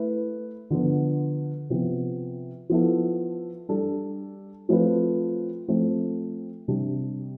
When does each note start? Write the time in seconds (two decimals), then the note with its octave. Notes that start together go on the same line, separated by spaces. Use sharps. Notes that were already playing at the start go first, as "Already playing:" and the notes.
Already playing: A3 E4 B4
0.70 D3 F3 B3
1.70 C3 F3 B3
2.70 F3 B3 E4 A4
3.69 G3 D4 A4
4.69 F3 A3 C4 F4 B4
5.68 F3 A3 C4
6.68 C3 G3 D4